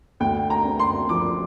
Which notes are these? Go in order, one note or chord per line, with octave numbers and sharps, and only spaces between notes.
D2 G5
A#5
C4
C6
F3 D6